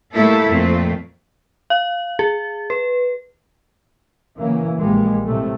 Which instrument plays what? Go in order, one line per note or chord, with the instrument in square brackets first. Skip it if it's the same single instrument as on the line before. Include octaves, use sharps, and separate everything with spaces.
[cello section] A2 G3 A3 A#3 E4 A4
F2 A#2 A3 C4
[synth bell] F5
G#4
B4
[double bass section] C#3 E3 F#3 A#3
A#1 G3 G#3 A#3
A2 C3 G3 A3